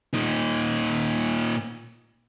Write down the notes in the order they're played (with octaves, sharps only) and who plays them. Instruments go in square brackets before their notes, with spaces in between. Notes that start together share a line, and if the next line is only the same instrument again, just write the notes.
[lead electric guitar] A#2 D#4